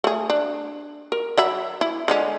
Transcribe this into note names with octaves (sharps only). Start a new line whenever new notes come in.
A3 G#4
D4
A#4
F#3 E5 B5
E4
D3 G#3 C#4